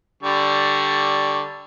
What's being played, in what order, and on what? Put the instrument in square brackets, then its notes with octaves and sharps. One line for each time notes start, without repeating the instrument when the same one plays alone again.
[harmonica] D3 G3 C#6